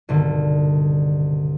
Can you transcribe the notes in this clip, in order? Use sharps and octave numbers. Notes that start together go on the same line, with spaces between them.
C2 G2 B2 D3 D#3